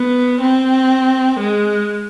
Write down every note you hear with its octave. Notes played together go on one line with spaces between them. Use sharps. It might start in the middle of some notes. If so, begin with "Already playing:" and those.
Already playing: B3
C4
G#3